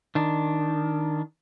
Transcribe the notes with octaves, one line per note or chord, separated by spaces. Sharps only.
D#3 D4